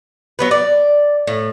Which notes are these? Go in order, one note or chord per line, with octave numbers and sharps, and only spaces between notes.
F#3 B3 B4
D5
A2